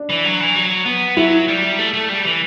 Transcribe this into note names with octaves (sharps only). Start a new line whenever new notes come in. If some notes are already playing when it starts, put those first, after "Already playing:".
Already playing: D4
E3
F#3
E3
F#3
B3
F#3 E4
G3
A3
A3
G3
E3